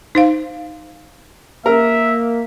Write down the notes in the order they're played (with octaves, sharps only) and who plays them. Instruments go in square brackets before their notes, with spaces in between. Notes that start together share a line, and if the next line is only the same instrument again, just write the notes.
[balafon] D#4 C5 F5
[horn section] A#3 [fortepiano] A#4 [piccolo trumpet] E5